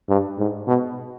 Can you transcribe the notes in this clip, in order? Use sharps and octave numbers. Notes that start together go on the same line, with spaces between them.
G2
G#2
B2